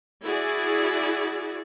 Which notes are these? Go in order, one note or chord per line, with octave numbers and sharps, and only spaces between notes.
E4 F#4 G#4 D5